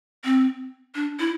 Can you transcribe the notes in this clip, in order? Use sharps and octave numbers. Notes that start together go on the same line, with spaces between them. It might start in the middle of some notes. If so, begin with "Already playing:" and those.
C4
D4
E4